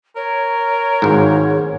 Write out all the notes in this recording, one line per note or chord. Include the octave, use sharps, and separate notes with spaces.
A#4 C#5
G#1 G#2